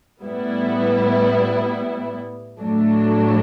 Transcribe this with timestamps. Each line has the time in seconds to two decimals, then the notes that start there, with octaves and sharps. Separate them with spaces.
0.22 A2 G3 B3 E4
2.60 A2 F#3 A3 D4